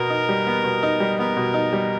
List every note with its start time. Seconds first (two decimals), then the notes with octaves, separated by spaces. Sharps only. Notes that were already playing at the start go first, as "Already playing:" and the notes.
Already playing: B2 B3 A#4
0.10 D#4
0.29 G3
0.47 B3
0.64 B2
0.83 D#4
1.00 G3
1.19 B3 A#4
1.37 B2
1.54 D#4
1.73 G3